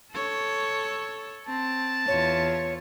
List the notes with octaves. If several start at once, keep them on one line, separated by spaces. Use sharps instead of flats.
A4 C#5
C4 A5
E2 F4 C#5